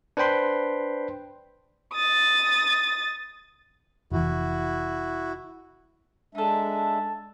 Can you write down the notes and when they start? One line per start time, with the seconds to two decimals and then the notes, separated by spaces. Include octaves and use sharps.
0.17 D4 B4 C5 G5 B5 C6
1.94 D#6 A6
4.11 F1 E3 E4 F#4
6.35 G#3 D4 D#4 A4 E5